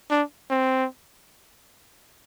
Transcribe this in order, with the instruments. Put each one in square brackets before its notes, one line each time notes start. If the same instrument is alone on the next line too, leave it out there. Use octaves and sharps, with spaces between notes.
[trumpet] D4
C4